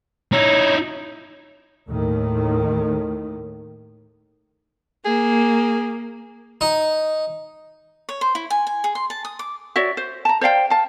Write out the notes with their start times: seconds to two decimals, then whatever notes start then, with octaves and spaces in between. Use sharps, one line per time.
0.33 D#4 E4 C#5
1.88 D#2 A2 D#3
5.05 A#3 G#4
6.61 D#4
8.09 C#5
8.21 C5
8.35 E4
8.50 G#5
8.67 G#5
8.84 G#4
8.95 C6
9.10 A5
9.25 D#6
9.39 D6
9.76 F#4 C#5 D5 E5
9.97 C5
10.25 A5 A#5
10.41 C5 D5 F5 G5
10.70 F5 A5